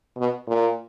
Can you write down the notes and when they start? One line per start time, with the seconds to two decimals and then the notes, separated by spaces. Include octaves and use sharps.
0.17 B2
0.48 A#2